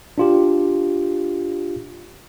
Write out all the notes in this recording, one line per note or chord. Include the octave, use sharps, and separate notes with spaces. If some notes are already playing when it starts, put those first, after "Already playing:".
D4 F4 G4